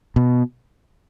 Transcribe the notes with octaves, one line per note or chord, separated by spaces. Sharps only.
B2